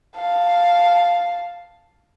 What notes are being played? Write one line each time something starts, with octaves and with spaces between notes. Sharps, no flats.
F5 A5